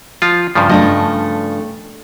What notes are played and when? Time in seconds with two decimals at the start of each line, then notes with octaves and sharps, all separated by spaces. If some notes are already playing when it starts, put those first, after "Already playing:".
0.22 F3 F4
0.55 G2 C#3 F3
0.69 A3 D4 D#5